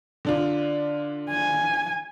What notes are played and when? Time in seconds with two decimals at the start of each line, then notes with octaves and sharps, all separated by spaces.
0.25 D3 D4 F4
1.30 G#5